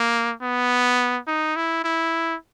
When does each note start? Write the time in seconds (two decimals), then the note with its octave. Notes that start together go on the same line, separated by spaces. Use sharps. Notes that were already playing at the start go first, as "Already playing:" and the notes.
Already playing: A#3
0.41 B3
1.27 D#4
1.56 E4
1.84 E4